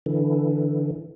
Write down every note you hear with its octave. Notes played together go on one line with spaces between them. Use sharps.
D3 E3